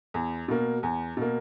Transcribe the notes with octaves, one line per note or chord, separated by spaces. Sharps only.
E2
B2 A#3
E2
B2 A#3